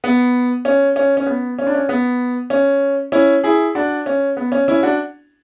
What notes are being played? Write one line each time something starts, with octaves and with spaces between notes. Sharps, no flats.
B3
C#4
C#4
C#4
B3
C#4
D4
C#4
B3
C#4
C#4 E4
E4 G#4
D4 F#4
C#4
B3
C#4
C#4 E4
D4 F#4